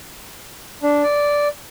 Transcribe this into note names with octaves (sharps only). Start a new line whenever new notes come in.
D4
D5